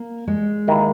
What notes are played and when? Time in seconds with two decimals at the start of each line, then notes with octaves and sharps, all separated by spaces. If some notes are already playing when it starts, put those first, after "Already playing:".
Already playing: A#3
0.27 G#3
0.68 D#2 D#3 A#3 E4